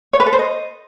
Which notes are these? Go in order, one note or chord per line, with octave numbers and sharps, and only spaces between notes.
C#5
B4
A4
C5
D#5